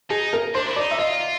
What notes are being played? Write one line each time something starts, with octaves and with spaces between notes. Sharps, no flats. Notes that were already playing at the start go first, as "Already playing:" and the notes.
D#4 G#4
A#4
D4 C5
E4
D#4 D5
E5
F4 D#5